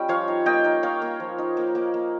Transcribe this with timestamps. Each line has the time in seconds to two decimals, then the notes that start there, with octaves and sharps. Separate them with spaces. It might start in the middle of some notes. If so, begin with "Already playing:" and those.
Already playing: G3 C#4 F4 D#5 G5
0.08 F3 C#5 F5
0.28 D#4
0.46 A#3 D#5 G5
0.64 D#4
0.83 A#3 C#5 F5
1.02 A#3
1.20 F3
1.38 D#4
1.57 A#3
1.75 A#3
1.94 A#3